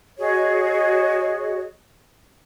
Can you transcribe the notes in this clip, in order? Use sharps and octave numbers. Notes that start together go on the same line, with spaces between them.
F#4 G#4 C#5 D#5